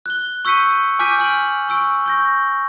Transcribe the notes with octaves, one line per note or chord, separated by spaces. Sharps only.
F#6 G7
C#6 E6 G6 B6 C#7 D#7
G#5 D6 F6 G6 B6 D#7
G#5 F6 F#7
C#6 E6 D7
C#6 G6 A#6